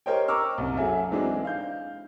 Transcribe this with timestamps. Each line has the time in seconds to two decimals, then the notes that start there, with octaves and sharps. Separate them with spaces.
0.06 G4 A#4 C5 C#5 D#5 G5
0.28 A#5 C#6 D6 E6 F6
0.58 C2 F#2
0.77 F#3 G#4 A4 E5
1.11 E3 G#3 C4 D4 D#4 F#4
1.44 F5 G6